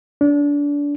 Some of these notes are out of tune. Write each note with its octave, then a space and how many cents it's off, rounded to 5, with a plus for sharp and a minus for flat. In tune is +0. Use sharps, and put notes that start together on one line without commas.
D4 -25